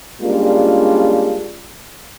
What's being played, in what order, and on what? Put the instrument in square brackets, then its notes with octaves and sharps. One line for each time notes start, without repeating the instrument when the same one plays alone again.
[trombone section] G3 G#3 A#3 C#4 D4 F4